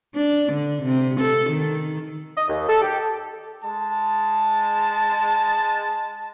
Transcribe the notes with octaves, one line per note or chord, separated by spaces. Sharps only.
D4
D3
C3
A4
D#3
D#5
D#2
A4
G4
G#3 A5